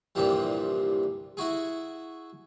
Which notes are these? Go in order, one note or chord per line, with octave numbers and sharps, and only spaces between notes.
C2 G2 A#2 E3 F3 G3
E4 F#4 G#4